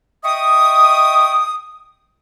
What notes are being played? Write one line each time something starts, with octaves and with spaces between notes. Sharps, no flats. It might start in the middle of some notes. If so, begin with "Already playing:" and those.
D#5 E5 G5 C#6 D#6